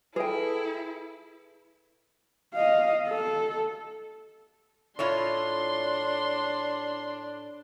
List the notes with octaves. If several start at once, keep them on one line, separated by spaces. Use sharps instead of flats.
E4 G#4 A4 B4 E5 G5
D#5 F5
A4
A2 D4 E4 F4 C#5 C6